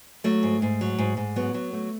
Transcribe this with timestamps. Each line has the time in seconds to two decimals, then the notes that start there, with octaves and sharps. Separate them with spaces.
0.24 F#3 A3
0.43 G#2
0.62 G#2
0.81 F#3
0.99 G#2
1.17 G#2
1.36 F#3 B3
1.54 F#3
1.73 A3